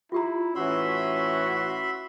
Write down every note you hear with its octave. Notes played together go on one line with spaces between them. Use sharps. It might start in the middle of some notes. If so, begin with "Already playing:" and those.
E4 F4 G4 A#5
A2 E3 C#4 F#4 E5 B5 C6